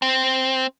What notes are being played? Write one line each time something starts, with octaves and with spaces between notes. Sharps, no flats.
C4